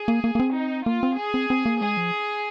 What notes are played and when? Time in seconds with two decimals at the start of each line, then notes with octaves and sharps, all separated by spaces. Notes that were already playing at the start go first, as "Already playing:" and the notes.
Already playing: G#4
0.08 A#3
0.24 A#3
0.35 A#3
0.40 C4
0.55 D#4
0.86 A#3 F4
1.03 C4
1.19 G#4
1.34 C4
1.50 C4
1.66 A#3
1.81 G#3 G#4
1.97 F3